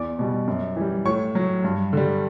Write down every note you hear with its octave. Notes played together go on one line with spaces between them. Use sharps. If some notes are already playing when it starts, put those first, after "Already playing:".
Already playing: E2 D5 D6
B2 G3
F#2
E3 G3
A2 C#5 C#6
F#3
G2
D3 G3